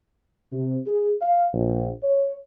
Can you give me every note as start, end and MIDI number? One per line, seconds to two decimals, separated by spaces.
0.52 0.79 48
0.86 1.14 68
1.22 1.46 77
1.53 1.90 34
2.03 2.34 73